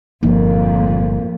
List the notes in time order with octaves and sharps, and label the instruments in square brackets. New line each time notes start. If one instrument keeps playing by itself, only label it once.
[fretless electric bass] G1 [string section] F2 A#2 [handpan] F3 A#3 D#4